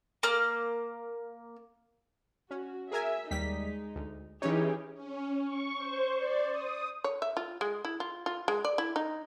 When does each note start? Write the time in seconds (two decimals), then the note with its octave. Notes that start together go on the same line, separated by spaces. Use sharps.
0.23 A#3 F6
2.51 C#4 F#4
2.91 G#4 A#4 E5 G#5
3.31 D#2 G3 G#3 D#4 B6
3.95 D2
4.42 E3 C#4 D#4 G4 G#4 C#5
4.93 C#4
5.43 C#6
5.77 C5
6.16 D5
6.50 D#6
7.04 C#5
7.22 E5
7.37 F4
7.61 G#3
7.85 E4
8.00 F4
8.26 F4
8.48 G#3
8.65 D5
8.78 E4
8.96 D#4